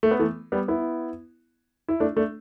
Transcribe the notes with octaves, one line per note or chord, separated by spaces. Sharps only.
A3
B3
E3 A3
G3 B3
B3 E4
E4
A3 D4
A3 D4